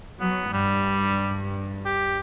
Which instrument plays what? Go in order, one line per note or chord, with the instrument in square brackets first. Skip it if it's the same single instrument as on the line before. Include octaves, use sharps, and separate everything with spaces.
[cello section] F#3 [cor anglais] B3
[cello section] G2 [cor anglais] G3
[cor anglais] G4